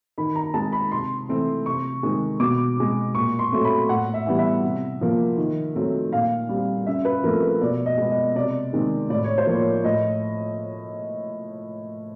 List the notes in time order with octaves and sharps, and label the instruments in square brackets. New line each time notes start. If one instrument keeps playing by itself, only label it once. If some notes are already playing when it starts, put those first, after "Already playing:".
[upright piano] D#3 B5
A#5
G#3 C4 A5
B5
C3 C6
E3 A3 C4
C3 C#6
D#3 G#3 C4
B2 D6
G#3 C4
A#2 C#6
C6
F#3 A3 C4
B5
A2 F#5
E5
E3 G3 B3
E5
C3
F3 A#3
D#3
F#3 A3 C4
A#2 F5
G3 C4
C#3 E5
B4
F3 A3 C4 A#4
B4
B2 D5
D#5
G#3 B3
D#5
C3 D5
D#3 G#3 C4
A2 D5
C#5
C5
F3 A#3 C#5
A2 D#5